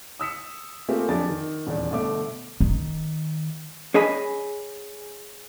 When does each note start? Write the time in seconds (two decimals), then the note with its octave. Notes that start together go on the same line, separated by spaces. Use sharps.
0.19 D#6 E6 B6 C#7
0.89 A3 A#3 C4 F4 G4 G#4
1.08 F2 F#3 D4 G#4 D6 A6
1.29 D#3
1.67 D#1 E2 D5
1.91 G1 B2 A3 D6
2.60 D#3
3.94 C#4 G#4 D#5 G#5 B5